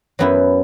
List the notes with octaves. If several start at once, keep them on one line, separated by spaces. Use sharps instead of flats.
F#2 F#3 B3 E4